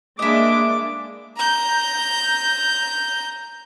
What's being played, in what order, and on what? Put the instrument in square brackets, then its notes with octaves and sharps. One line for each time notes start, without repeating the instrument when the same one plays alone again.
[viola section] G#3 A#3 D4 [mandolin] E4 D#5 [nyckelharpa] D6
[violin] A#5 G6